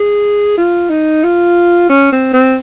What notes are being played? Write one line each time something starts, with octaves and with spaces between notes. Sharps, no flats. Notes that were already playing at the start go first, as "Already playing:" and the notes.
Already playing: G#4
F4
D#4
F4
C#4
C4
C4